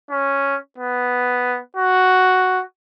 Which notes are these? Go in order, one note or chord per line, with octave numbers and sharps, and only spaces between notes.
C#4
B3
F#4